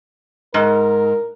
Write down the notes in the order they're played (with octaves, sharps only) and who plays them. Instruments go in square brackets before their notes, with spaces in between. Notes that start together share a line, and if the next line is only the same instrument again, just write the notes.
[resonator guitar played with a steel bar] G#2 [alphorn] A#4